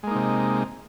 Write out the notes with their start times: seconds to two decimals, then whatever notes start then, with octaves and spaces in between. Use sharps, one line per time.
0.03 G#3
0.07 A#3
0.11 D#4
0.15 C3